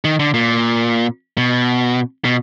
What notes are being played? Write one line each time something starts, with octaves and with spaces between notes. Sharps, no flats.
D#3
D3
A#2
B2
B2